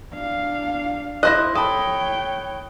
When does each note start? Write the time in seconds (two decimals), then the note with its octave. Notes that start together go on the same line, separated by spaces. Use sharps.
0.14 D4 F5
1.23 E4 C5 D#5 F#6 A#6
1.55 A4 C#5 G5 B5 D#6